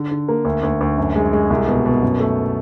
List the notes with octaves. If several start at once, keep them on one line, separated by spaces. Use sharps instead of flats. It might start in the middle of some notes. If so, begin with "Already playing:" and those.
Already playing: D3
D3
A#3
D2
D2
D2
F#2
G#3
G#3
C2
B2
B2
F#2
A3